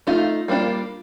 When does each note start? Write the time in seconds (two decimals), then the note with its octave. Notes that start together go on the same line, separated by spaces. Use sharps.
0.07 A3 D#4 F4
0.48 G3 A#3 D4 F4